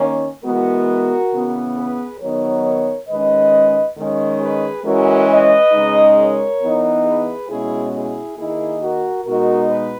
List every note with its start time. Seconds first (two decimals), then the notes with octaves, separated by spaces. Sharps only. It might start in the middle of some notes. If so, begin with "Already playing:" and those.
Already playing: D#3 A#3 C#4 A#4 C#5
0.44 E3 G#3 B3 F#4 A#4
1.32 C#3 E3 B3
1.76 G#4 B4
2.20 D#3 F#3 B3 D#4 A#4 C#5
3.08 D#3 G#3 C#4 B4 D#5
3.96 D#3 G#3 C#4
4.40 G#4 B4
4.84 E3 G#3 C#4 F#4 A#4
5.29 B4 D#5
5.72 C#3 G#3 D#4
6.17 A#4 C#5
6.61 E3 B3 D#4
7.05 G#4 B4
7.49 B2 G#3 C#4 E4 G#4
7.93 E4 G#4
8.37 D#3 A#3 D#4 E4 G#4
8.81 F#4 A#4
9.25 B2 G#3 D#4 F#4 A#4
9.69 B4